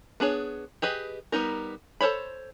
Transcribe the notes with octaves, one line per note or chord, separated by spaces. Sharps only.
B3 D4 G#4 C#5
G4 G#4 B4 D#5
G3 B3 D#4 A#4
A4 A#4 C5 C#5 B5